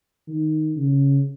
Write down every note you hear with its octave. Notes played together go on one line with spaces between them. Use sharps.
D#3
C#3